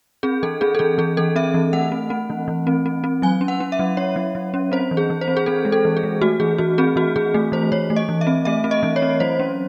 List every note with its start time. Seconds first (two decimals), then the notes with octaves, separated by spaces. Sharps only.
0.23 C4 G#4
0.43 E3 A4
0.61 C4 G#4
0.75 A4
0.79 E3 G#4
0.98 E3 G#4
1.17 E3 A4
1.36 C4 E5
1.54 E3
1.73 A3 F#5
1.92 C4
2.10 C4
2.30 E3
2.48 E3
2.67 C4
2.86 C4
3.04 C4
3.22 F#3 G#5
3.41 C#4
3.48 F#5
3.60 C#4
3.72 E5
3.79 F#3
3.97 C#4 C#5
4.16 F#3
4.35 F#3
4.54 C#4
4.72 C4 C5
4.91 E3
4.97 G#4
5.10 E3
5.21 C5
5.28 C4
5.37 G#4
5.46 C4 A4
5.65 G#3
5.72 A4
5.85 E3
5.97 G#4
6.03 G#3
6.21 A3 F#4
6.40 E3 G#4
6.58 E3 F#4
6.78 C4 G#4
6.96 E3 F#4
7.16 E3 G#4
7.34 A3
7.52 E3 C5
7.72 E3 C#5
7.90 A3
7.96 D#5
8.09 E3
8.21 E5
8.27 C4
8.45 A3 E5
8.64 C4
8.71 D#5
8.83 E3
8.96 C#5
9.02 C4
9.20 F#3 C5
9.39 C#4